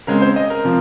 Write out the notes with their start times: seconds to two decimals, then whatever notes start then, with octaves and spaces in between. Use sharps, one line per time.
0.07 C#3 G#3 C4 A#4
0.22 C5
0.36 D#5
0.50 A#4
0.65 C3 F3